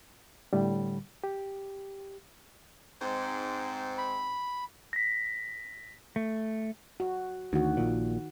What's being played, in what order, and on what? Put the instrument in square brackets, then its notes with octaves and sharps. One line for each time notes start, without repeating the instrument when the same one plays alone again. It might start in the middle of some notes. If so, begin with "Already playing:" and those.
[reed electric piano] A2 D3 G3
G4
[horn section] G#2 C4
[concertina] B5
[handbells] A#6 B6
[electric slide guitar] A3
[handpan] F#4
[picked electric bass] D2 [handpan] D#3 F#4
[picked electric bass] A#1 A#2